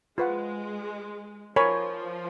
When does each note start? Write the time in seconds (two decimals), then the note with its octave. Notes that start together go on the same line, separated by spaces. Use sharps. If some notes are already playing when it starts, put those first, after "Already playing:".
0.18 G#3 F4 B4 F#5
1.56 F3 A#4 C#5 G#5 B5